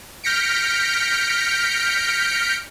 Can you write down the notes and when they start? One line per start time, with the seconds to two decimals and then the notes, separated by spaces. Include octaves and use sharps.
0.24 F6 G6 A#6 B6 C#7 D7